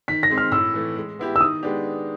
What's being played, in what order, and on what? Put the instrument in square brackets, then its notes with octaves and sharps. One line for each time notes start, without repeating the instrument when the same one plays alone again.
[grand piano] D#3 [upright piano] B6
[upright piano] A#6
[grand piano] G#3 C4 D#4
[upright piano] F6
[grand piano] A2 [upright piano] E6
[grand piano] E3 A3
G#3
B3 E4 G4
[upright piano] E6
[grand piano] D#3 [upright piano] D#6
[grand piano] G#3 B3 D4 G4